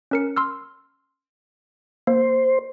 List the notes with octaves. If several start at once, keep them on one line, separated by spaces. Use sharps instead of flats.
C#4 A#4 C#7
C6 E6 F6
A#3 C5